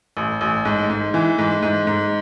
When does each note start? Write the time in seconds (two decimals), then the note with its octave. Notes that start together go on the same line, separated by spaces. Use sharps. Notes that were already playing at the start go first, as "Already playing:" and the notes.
0.17 A1
0.41 A1
0.65 G#2
0.90 G#2
1.14 E3
1.39 G#2
1.62 G#2
1.87 G#2